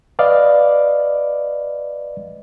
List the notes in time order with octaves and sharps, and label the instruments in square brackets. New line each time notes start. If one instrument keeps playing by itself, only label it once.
[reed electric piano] B4 D5 D#5 F5